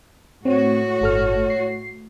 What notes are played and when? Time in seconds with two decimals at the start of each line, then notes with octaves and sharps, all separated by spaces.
0.45 A2 C4 F#4 C#5
1.01 G1 A4 F6
1.50 C7